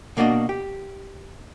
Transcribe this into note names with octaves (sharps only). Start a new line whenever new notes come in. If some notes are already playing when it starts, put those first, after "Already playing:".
B2 A#3 D4 F#4 D#5
G4